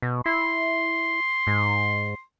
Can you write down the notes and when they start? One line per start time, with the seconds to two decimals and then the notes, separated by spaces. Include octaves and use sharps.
0.02 B2
0.26 E4 C6
1.47 G#2